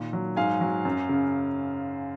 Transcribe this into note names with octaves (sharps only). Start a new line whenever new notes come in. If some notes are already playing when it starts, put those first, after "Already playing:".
Already playing: A#2 D#3
F#3
G#2 F5 G#5
F#3
F#2
C#3